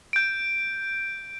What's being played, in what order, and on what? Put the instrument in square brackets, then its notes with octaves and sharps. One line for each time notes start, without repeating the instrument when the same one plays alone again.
[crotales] G6 D7